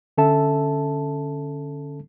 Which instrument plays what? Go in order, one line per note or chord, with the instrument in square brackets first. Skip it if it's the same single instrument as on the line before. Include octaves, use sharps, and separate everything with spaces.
[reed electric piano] D3 C#4 A4 E5 A5